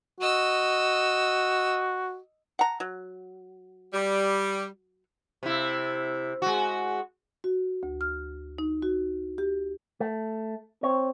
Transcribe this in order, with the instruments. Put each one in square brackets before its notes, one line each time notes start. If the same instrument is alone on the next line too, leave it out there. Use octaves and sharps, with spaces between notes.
[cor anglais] F#4 [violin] D#5 E6
[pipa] F#5 A#5
F#3
[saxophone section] G3
[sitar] C3 E4
G#3 F#4
[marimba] F#4
D2
F6
D#4
F#4
G4
[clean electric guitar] A3
[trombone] C4 [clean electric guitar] C#5